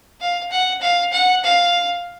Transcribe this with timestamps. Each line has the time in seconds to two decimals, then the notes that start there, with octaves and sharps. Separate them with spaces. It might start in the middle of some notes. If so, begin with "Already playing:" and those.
0.20 F5
0.51 F#5
0.81 F5
1.13 F#5
1.43 F5